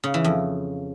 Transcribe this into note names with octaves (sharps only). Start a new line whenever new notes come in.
C#3
E3
F2